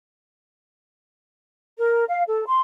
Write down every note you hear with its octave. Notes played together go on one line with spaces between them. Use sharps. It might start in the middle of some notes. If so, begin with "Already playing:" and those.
A#4
F5
A4
C6